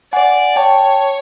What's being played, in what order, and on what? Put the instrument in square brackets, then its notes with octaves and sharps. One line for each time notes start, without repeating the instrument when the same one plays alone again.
[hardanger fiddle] D5 [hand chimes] F#5 G#5
[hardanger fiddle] C#5 [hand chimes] G5 A5